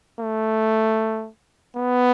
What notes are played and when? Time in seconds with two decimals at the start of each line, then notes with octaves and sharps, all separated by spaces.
0.20 A3
1.77 B3